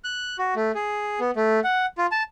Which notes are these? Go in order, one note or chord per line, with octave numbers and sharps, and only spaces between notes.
F#6
F#4
A3
G#4
B3
A3
F#5
F4
A5